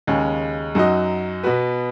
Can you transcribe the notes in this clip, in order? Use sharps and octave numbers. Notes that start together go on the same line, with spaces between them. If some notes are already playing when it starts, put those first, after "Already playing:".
D#2 C#3 G#3 C#4
F#2 F#3 D#4 F#4 D#5
B2 B3 F#4 B4